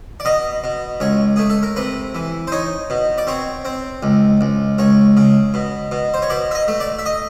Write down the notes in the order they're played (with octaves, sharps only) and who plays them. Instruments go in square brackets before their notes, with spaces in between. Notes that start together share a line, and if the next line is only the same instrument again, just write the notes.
[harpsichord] D5
B2 D#5
B2
C#2 C#5
A3 G#4
A4
A#4
C3 B4
E3
C5
D#4 C#5
B2
D5
C4 C#5
C4
C#2
C#2
C#2 C#5
C#3
B2
B2
C5
C#5
B2 D5
E5
D#5
A3
D5
E5
D#5